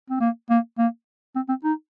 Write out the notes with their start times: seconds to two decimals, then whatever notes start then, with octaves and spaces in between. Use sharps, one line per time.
0.10 C4
0.20 A#3
0.50 A#3
0.79 A#3
1.36 C4
1.49 C4
1.64 D#4